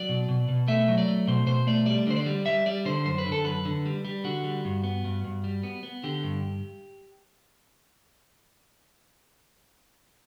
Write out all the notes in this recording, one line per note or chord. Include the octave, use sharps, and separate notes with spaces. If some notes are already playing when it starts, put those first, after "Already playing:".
Already playing: F#3 D5
B2
B2
B2
A3 E5
F#3
D5
A3
B2 C5
B2 C5
A3 D5
G3 D5
D3 C5
D5
G3
G3 E5
G3 D5
D3 C5
F#2 C5
B4
D3
A4
F#2 B4
D3
G3
G3
D3 F#4
G3
G2
B3
G2
G2
G3
B3
B3
D3 G4
G2